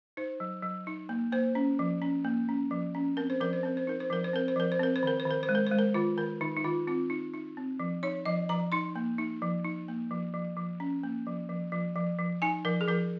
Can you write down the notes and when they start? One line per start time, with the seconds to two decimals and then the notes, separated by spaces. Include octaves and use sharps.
0.17 D#4 C5
0.40 F#3
0.63 F#3
0.87 D#4
1.09 A#3
1.32 A#3 C5
1.55 C#4
1.79 F3
2.02 C#4
2.24 A#3
2.49 C#4
2.71 F3
2.95 C#4
3.17 C4 A#4
3.30 C5
3.41 F3 A#4
3.53 C5
3.63 C4 A#4
3.77 C5
3.87 D#4 A#4
4.00 C5
4.10 F3 A#4
4.24 C5
4.34 C4 A#4
4.48 C5
4.56 F3 A#4
4.72 C5
4.79 C4 A#4
4.96 C5
5.03 D#3 A#4
5.20 C5
5.26 D#3
5.31 A#4
5.43 C5
5.49 G#3
5.55 A#4
5.67 G#3 C5
5.79 A#4
5.94 D#3 F4
6.17 D#3 A#4
6.41 D#3 D#4
6.57 D#4
6.64 D#3 F4
6.87 C4 F4
7.10 D#4
7.34 D#4
7.57 C4
7.80 F3
8.03 D#4 C#5
8.25 F3 D#5
8.49 F3 A#5
8.72 D#4 C6
8.96 A#3
9.18 D#4
9.42 F3
9.64 D#4
9.88 A#3
10.11 F3
10.34 F3
10.57 F3
10.80 C#4
11.03 A#3
11.27 F3
11.49 F3
11.72 F3
11.96 F3
12.19 F3
12.42 D#4 G#5
12.65 F3 A#4
12.81 G#4
12.88 F3 A#4